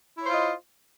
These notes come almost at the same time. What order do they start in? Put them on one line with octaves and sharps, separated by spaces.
E4 C#5 C5 F4 D#5